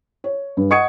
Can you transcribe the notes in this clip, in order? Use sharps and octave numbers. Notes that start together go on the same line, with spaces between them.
C#5
G2
D#5 F#5 C#6 D#6 G#6 C#7